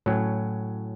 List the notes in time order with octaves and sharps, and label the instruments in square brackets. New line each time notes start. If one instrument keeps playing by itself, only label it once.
[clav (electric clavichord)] A2 F#3 C#4